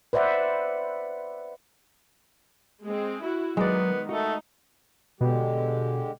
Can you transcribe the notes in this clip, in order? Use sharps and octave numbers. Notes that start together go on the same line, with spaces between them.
B4 C5 D5 E5 F#5
G#3 C4
E4 F#4
D#3 F#3 G#3 B3 D5
A3 D#4 F#4
B2 D3 G#3 G4